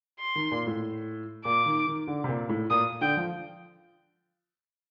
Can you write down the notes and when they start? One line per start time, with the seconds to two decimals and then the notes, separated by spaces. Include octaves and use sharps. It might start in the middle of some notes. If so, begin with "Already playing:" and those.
0.20 C6
0.36 D#3
0.51 A#2
0.67 A2
1.45 A#2 D6
1.66 D#3
1.87 D#3
2.07 D3
2.24 C3
2.28 A#2
2.49 A2
2.70 A#2 D#6
3.01 D3 G5
3.17 F3